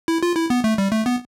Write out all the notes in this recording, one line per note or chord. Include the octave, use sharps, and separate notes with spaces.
E4
F4
E4
B3
A3
G3
A3
B3